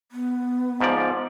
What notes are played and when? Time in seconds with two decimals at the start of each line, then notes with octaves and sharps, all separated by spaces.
0.12 B3
0.80 G#2 F3 D5